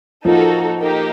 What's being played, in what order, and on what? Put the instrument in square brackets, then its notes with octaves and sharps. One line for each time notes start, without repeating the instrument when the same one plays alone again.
[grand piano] F3 [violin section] A#3 D#4 F#4 A4
[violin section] A#3 D#4 G4